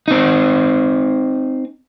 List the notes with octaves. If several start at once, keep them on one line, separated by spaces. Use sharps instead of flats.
C4 D#4